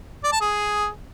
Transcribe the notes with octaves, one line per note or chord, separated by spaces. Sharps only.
D5
A5
G#4